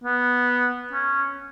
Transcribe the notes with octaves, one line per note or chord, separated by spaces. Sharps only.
B3
C#4